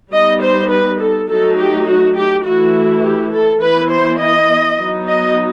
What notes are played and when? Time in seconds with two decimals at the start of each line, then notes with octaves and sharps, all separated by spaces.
0.12 G3 B3 D#4 D#5
0.42 C5
0.70 B4
1.00 A4
1.29 F#3 A3 D#4 A4
1.58 G4
1.87 F#4
2.16 G4
2.45 E3 A3 E4 F#4
3.03 G4
3.32 A4
3.62 E3 B3 E4 B4
3.91 C5
4.20 D#5
4.79 F#3 B3 D#4
5.08 D#5